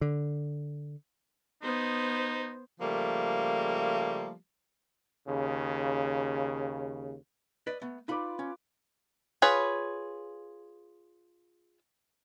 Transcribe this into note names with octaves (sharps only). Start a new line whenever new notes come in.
D3
B3 D#4 C5
C#3 F3 G3 A3 A#3
D#2 C#3
B4 D5 D#5
A3 B3
D#4 F4 B4 D5 B5
C#4
F4 G#4 B4 C#5